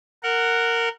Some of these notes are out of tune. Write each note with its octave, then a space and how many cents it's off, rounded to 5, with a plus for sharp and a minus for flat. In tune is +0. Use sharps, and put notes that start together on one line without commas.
A#4 -15 F#5 +0